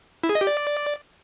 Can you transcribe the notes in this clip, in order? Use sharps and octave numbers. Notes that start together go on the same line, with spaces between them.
E4
G#4
D#5
G4
D5